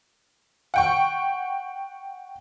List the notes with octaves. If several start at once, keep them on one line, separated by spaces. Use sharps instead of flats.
F#5 G5 C#6